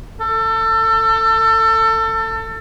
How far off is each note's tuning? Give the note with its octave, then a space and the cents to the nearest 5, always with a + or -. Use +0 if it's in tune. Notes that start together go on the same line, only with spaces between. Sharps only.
A4 +25